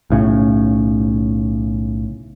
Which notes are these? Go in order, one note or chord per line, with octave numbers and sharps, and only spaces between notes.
B1 A2 C#3